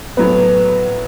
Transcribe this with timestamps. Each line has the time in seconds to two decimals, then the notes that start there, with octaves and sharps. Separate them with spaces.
0.17 A2 F#3 B3